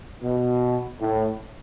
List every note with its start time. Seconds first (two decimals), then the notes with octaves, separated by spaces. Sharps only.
0.23 B2
1.01 A2